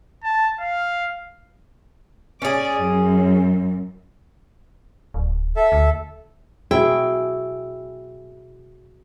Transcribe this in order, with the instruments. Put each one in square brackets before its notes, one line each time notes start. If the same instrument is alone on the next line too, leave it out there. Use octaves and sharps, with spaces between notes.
[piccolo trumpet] A5
F5
[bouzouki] C#4 G#4 [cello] D5
[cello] F#2
[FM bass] D1
[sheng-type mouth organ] A4 E5
[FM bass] D2
[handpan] B2 F#4 G#4 [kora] E4 [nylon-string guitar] G5